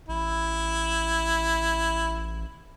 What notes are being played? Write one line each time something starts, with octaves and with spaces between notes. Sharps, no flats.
A1 E4